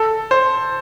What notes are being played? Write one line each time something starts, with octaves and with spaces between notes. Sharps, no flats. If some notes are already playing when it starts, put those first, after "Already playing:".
Already playing: A4
C5